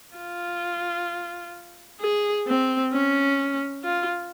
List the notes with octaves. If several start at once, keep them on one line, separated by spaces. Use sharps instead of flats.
F4
G#4
C4
C#4
F4